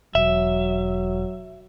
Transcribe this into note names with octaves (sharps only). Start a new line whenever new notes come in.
E1 F#3 E5